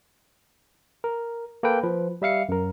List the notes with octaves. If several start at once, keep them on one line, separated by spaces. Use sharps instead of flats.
A#4
A#3 A4 B4 G5
F3 B4
G3 E5 F5 C#7
F#2 A#4